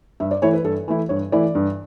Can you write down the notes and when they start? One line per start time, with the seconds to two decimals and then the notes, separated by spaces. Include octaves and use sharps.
0.20 G2 E5
0.31 D5
0.42 E3 A3 E4 C#5
0.54 B4
0.64 G2 A4
0.88 E3 A3 E4
1.09 G2 C#5
1.32 E3 A3 E4 D5
1.55 G2